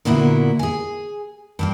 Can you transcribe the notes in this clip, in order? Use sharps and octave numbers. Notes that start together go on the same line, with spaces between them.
A#2 D3 A#3 B3 E4 F#4
G#4 G#5
G2 A#3 G5